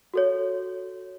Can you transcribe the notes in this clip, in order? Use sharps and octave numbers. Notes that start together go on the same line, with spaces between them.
F#4 A4 C#5